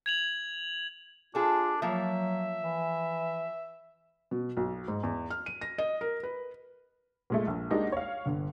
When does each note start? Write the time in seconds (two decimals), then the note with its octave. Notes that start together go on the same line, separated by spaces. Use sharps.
0.06 G#6 F7 F#7
1.35 D4 F4 G#4 A4
1.82 F3 F#3 A#3 E5
2.62 E3
4.31 B2
4.57 B1
4.88 G#2
5.03 E2
5.31 F6
5.46 D#7
5.61 A#6
5.78 D#5
6.01 A#4
6.23 B4
7.30 A#2 G#3 A3
7.47 A#1
7.70 G#3 A#3 D4 D#4 F#4 G4
7.92 C#5 F5
8.26 G1 D3